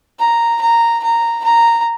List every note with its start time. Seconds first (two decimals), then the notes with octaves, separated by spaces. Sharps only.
0.20 A#5
0.62 A#5
1.04 A#5
1.45 A#5